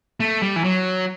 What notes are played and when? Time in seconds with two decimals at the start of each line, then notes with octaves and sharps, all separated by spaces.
0.20 A3
0.42 G3
0.56 E3
0.64 F#3